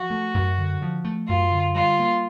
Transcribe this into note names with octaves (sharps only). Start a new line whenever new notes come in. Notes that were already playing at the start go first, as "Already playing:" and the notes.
Already playing: F3 F#4
A3
F#2
D3
F3
A3
F#2 F4
D3
G3 F4
A#3